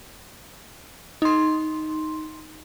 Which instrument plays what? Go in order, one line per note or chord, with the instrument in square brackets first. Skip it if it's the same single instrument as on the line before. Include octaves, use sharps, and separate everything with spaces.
[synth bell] D#4 C6